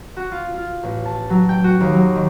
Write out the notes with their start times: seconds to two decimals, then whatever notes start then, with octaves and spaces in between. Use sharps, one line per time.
0.17 F#4
0.32 F4
0.54 F4
0.83 A1
1.06 A5
1.30 F#3
1.49 G5
1.64 F#4
1.80 D#2
1.93 F#3
2.16 D#3